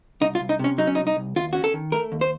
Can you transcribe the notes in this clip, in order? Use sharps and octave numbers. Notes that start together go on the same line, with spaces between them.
C2 D#4
F4
C2
D#4
C3 C#4
F#3 D#4
C#4
D#4
C2
D#4
C2
D#2 F4
C#4 F#4
A4
D#3
A3 A#4
D#2
C5